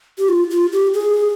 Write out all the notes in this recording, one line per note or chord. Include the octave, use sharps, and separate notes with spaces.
G4
F4
F4
G4
G#4